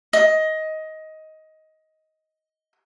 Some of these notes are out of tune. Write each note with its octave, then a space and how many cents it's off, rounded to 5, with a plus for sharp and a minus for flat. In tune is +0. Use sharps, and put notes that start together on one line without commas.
D#5 +15